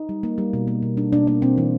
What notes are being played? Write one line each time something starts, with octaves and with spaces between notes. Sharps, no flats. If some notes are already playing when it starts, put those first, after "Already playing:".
Already playing: D#4
G3
A#3
G3
B2
A#3
B2
G3 D4
B2 D4
A#3 D4
B2 C4
E3